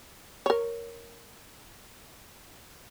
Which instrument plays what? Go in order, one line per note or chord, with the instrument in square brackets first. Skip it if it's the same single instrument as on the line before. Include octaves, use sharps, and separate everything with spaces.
[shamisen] A#4 C#5